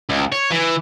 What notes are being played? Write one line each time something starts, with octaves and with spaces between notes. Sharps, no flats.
C#2
C#5
E3